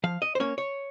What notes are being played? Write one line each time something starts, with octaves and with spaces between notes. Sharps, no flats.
F3 F5
D#5
C5
A#3 C#4 C#5
C#5